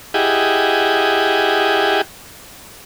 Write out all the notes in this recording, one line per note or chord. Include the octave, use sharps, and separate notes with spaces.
E4 G4 G#4 D#5 F#5